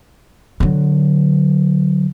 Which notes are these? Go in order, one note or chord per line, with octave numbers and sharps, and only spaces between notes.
D3 F#3